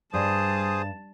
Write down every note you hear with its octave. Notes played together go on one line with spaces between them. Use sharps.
G2 G3 G#4 C5 A5 D#6